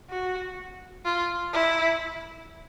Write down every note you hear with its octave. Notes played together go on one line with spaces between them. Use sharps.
F#4
F4
E4